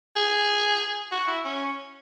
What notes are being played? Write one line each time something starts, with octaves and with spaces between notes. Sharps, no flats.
G#4
F#4
E4
C#4